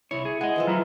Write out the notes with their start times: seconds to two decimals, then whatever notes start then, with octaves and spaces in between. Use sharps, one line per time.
0.11 C2 E4 C#5
0.25 G#4
0.41 G#3 G#4 D#5 F#5
0.56 E3 F3 A4
0.67 F#3 E4 A#5 F6